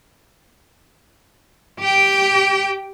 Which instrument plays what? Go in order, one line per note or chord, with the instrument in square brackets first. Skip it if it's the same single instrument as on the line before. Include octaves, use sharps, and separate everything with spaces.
[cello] G4 G5